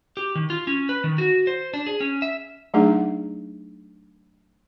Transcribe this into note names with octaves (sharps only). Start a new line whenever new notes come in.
G4
D#3
F4
C#4
B4
D#3
F#4
C5
D4
G#4
C#4
E5
F#3 A3 D4 D#4 G#4 F#5